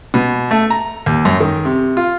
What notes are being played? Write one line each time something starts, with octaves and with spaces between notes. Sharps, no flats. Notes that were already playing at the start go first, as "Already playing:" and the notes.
B2
A3
A#5
D#2
F#2
D#3
C3
F4